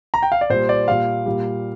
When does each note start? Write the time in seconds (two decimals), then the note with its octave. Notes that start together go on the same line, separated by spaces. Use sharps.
0.14 A#5
0.23 G5
0.32 F5
0.41 D5
0.50 A#2 G3 C5
0.69 D5
0.88 A#2 G3 F5
1.26 A#2 G3